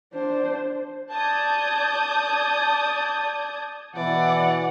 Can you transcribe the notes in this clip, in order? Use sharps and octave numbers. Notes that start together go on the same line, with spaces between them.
D4 C5
D5 A5 D#6 G6 G#6
B2 E3 D5 F#5